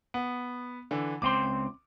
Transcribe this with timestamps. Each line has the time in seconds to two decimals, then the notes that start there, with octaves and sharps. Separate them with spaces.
0.14 B3
0.91 D3 E3
1.22 C#2 C4 C6 D6